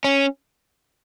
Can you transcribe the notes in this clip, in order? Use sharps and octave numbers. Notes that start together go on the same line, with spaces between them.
C#4